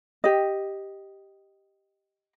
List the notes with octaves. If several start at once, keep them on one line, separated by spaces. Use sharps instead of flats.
G4 D#5